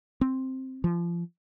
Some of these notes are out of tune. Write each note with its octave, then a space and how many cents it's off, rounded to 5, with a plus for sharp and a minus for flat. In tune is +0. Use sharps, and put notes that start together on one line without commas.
C4 +5
F3 -30